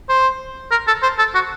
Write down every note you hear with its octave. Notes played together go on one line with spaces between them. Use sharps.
C5
A#4
A4
C5
A4
F#4